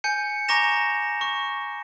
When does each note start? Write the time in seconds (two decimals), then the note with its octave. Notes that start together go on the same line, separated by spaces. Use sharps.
0.04 G#5 G6 C#7
0.48 G#5 A#5 C#6 D6 A#6 E7
1.21 C#6